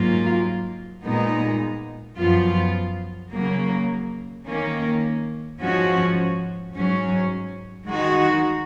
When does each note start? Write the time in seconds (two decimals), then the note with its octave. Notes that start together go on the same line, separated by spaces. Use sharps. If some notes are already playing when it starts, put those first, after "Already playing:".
Already playing: G#2 F#3 A#3 F4
1.03 A#2 G#3 B3 D#4
2.18 F#2 F3 B3 F4
3.32 C#3 F#3 A#3
4.46 D#3 A#3 C#4
5.60 G#2 F3 G#3 C#4 F#4
6.74 G#2 F#3 C#4
7.88 D#3 G#3 D#4 F#4